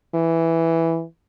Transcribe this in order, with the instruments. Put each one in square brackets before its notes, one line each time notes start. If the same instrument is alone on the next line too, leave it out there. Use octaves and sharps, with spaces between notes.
[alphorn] E3